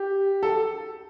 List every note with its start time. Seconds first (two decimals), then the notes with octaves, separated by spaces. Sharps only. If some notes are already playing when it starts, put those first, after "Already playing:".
Already playing: G4
0.43 A4